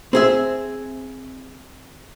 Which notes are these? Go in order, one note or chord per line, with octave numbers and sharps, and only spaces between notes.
C4 G#4 E5